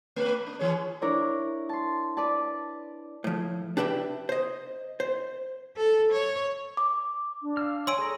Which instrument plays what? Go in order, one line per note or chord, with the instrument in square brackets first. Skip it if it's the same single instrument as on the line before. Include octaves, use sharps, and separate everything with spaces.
[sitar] A3 B4
D4
E3 G#4 C#5
[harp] D4 E4 A#4 C#5 D5
A5 C6
B4 D5 A5
[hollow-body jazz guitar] A2 F3
D4 G4 B4 E5 G5
C5 D#5
C5
[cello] A4
C#5
[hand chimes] D6
[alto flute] D4
[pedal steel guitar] F5 E6 F6
[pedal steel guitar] C#5 G#5 [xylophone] C6 E6 D7
[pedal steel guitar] G#4 A4 A#5